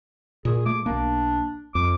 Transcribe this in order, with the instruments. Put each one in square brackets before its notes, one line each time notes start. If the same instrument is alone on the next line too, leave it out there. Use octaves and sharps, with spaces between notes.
[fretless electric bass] A#2 [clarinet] G#4
[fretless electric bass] A3 [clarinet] D6
[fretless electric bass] B1 A#3 [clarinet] D4
[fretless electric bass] F2 [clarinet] D6